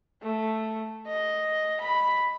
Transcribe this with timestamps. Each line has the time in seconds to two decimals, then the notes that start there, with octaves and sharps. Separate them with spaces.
0.22 A3
1.07 D#5
1.80 B5